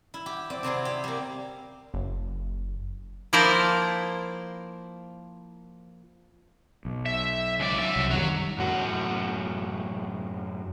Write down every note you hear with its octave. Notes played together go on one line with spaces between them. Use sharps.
E4
G4
C4 D5
C3 C4 E4 G#4
G4
G3 A#3
F#1
F3 A#3 E4 A#4 C5 D5
B1
E5
C#2 D5
F#3 E5
C2
F#2 D#3 G3 F#4 A#5
F#2 A2 F#4